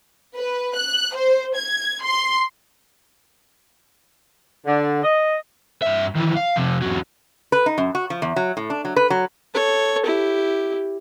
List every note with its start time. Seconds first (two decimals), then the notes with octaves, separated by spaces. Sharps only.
0.35 B4
0.76 F#6
1.15 C5
1.56 G#6
2.03 C6
4.66 D3
5.03 D#5
5.82 G2 E5
6.15 D#3 E3
6.36 F5
6.56 F2 C3
6.82 E2 F#3
7.52 B4
7.66 D#4
7.78 F#2
7.95 F#4
8.10 F3
8.22 E2
8.36 F#3
8.57 A2
8.70 D4
8.85 F#3
8.96 B4
9.10 F#3
9.54 A4 C#5
10.05 E4 G4